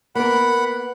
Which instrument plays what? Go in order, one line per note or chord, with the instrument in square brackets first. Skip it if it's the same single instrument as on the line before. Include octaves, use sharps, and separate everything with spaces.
[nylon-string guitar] A#3 B3 A#4 [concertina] F#5 B5